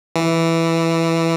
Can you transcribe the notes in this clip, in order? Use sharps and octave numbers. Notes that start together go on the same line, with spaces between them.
E3